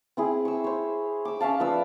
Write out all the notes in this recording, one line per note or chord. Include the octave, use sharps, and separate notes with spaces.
C4 E4 G#4
C#6 E6
C5 C#5
D6 E6
C#4 E5 F5 A5
F3 B4 D5 E6